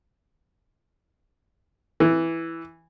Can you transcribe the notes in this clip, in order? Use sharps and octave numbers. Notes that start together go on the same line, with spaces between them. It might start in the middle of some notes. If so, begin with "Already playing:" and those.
E3